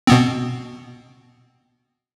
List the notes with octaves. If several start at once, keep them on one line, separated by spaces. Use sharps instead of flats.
B2 B3 C4